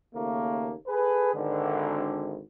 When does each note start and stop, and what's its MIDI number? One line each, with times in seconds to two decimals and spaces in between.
0.15 0.74 39
0.15 0.74 49
0.15 0.74 57
0.15 0.74 58
0.88 1.33 68
0.88 1.33 69
0.88 1.33 71
1.34 2.41 32
1.34 2.41 50